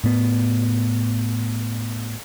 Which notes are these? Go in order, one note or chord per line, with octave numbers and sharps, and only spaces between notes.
A2 B3